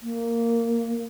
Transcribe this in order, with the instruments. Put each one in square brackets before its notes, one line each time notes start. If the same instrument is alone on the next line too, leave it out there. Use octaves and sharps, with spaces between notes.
[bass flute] A#3